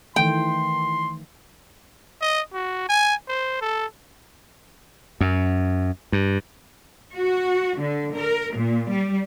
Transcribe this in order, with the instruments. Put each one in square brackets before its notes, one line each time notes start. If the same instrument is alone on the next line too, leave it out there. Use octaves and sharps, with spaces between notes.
[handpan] D#3 E3 A3 [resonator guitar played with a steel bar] G5 [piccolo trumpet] C6
[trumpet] D#5
F#4
G#5
C5
A4
[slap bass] F#2
G2
[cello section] F#4
D3
A#4
A#2
G3